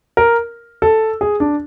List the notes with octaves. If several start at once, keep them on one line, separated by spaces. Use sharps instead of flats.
A#4
A4
G#4
D4